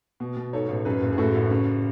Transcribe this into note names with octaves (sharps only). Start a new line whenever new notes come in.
B2
B2
G#2 A4 C#5
A1
F#2 G#4 B4
F#1
G#4
A2 F#4 A4
A1
C#3